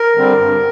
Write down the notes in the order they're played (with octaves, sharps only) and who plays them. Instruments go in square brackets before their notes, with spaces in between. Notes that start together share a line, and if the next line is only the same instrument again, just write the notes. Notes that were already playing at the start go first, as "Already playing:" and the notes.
Already playing: [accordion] A#4
D3 G3 C4
G2